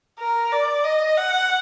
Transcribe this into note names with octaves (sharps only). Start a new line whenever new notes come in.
A#4
D5
D#5
F#5